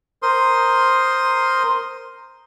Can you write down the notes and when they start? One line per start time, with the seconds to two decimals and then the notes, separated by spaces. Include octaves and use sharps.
0.22 A#4 C5 C6 D#6